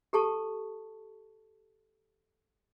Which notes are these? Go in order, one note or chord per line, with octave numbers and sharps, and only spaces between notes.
G4 A4 A5 C#6